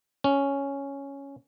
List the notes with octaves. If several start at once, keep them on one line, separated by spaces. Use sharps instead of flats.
C#4